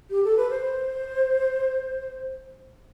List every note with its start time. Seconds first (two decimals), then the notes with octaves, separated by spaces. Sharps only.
0.10 G4
0.24 A4
0.36 B4
0.49 C5